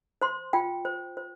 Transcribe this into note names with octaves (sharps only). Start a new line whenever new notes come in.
C5 C6
F4 G5
C5
C5